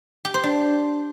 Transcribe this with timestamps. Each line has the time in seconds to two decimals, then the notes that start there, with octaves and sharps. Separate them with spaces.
0.25 G4
0.34 C5
0.44 D4